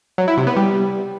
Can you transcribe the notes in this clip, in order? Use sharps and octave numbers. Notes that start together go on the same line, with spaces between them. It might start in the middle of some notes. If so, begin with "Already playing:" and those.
F#3
E4
C3
B3
G3